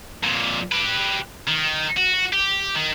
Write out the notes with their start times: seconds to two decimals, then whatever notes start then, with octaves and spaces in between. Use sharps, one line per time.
0.23 F2 A#2
0.72 G4 B4
1.47 D#3
1.97 F#4
2.33 G4
2.75 D#3